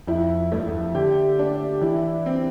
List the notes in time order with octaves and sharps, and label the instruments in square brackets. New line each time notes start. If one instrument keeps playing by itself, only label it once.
[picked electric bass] F2 [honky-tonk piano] E4
[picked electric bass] G2 [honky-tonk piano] A3
[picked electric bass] F2
E2
F2
[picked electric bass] D3 [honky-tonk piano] G4
[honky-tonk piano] D4
[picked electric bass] E3 [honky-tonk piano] E4
[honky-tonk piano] C4